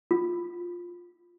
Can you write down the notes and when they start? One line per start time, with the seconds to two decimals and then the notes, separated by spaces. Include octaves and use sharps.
0.11 F4